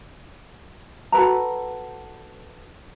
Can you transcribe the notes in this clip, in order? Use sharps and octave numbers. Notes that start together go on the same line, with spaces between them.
F#4 A4 B4 A#5